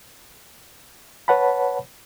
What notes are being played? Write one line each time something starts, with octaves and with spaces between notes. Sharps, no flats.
B4 C#5 F#5 A5 B5